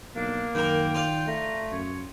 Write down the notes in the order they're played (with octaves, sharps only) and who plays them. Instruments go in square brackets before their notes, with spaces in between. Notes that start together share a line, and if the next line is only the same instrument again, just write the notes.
[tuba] B1 [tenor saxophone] A#3 [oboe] D4
[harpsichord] F#2 A#4 [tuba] D#3 [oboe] G5
[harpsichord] F4 D5 F5
[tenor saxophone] A3 [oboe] A#5
[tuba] F#2 [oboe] C#5